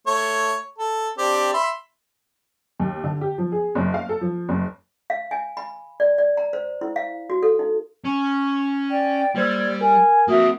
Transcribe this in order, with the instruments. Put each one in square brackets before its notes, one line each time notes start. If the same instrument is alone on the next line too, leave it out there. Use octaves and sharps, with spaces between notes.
[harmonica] A3 C#5
A4
C4 D4 G4
E5 B5 C6
[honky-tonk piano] D#2
D3
G4
F3
G#4
F#1
F5
A4
F3
F#1
[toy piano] F5
G#5
B5
D5
D5
A#5
C5
E4
F5
F#4
A4
D#4
[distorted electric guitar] C#4 [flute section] C#6
[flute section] D5 G5
[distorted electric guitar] G3 [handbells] A#3 C5 E6 [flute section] D5 G#6
[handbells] A#4 [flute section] G#5
[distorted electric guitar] A#3 C4 [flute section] F#4 E5 D#6